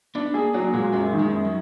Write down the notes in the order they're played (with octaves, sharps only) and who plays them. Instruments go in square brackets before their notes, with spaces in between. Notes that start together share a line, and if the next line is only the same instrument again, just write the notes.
[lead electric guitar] B3 [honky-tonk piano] D4
[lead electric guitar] A#3 [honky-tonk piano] G#4
[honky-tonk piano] F#3 [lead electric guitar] A#3
[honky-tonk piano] A#2 [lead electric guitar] G#3
[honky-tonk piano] F#2 [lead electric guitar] G#3
[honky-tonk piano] D#3
[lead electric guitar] G#3
[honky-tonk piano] F#2
[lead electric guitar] F#3